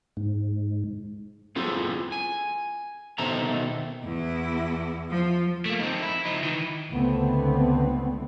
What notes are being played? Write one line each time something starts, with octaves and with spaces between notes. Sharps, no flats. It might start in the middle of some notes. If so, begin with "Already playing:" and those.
G#2
B3 C4 F4 G#4 A4
G#5
B2 D#3 C4 A4 E5 A#5
E2 E4
F3
A3 A#3
C4 D#4
E4
F3 D#4
D#3 E3
C#2 D3 A3 B3 C4